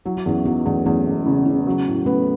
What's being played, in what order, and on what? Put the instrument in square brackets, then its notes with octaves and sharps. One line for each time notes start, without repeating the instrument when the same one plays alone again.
[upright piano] F#3 [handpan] E4
[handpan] F#4
[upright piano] E2 [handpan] C#4 E4
[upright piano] F#3 [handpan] B3 D#4
[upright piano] E2 [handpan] A3 C#4
[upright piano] E2 [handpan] A3 C#4
[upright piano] E1
C#3
C#3
F#3
A2
[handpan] A3 C#4 [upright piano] B3